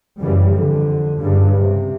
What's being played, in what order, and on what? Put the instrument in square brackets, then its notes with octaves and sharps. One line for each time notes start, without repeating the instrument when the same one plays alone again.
[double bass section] F#2 C#3 E3 G3
F2 D3
G2 C#3 G3
C3